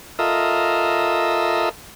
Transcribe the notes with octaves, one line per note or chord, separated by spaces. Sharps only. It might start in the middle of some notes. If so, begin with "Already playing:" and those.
F4 A4 A#4 D#5 E5